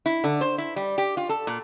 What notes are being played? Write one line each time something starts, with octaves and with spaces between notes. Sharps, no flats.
E4
D3
C5
E4
G3
G4
F4
A4
A#2